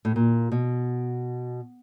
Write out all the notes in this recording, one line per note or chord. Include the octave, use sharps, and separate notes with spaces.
A2
A#2
B2